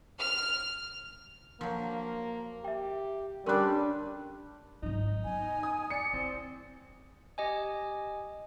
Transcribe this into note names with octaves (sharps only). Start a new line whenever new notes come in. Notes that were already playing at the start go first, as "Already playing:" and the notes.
F6
F3 F#3 A#3
G4 E5 G5
D3 G3 C#4 D4 A#4 C6 F#6
G#1 F#3 D#4
B3 G#5
D#6
D5 C#7
C4 E4
G4 D#5 G#5